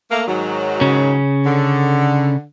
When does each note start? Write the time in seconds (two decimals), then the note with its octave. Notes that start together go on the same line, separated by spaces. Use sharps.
0.11 A3 A#3
0.27 G#2 D#3 F#3
0.81 C#3 C#4
1.45 D3